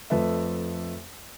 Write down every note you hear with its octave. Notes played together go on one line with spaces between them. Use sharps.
F2 A3 A4 B4 E5